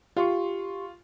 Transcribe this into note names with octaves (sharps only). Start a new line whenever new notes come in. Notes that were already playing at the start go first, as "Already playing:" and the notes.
F4 G4 C6 C#6